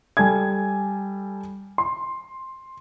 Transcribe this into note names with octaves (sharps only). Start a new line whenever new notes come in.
G3 A4 G#5 G#6
C6